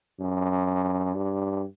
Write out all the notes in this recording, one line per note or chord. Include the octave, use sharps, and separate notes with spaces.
F#2
G2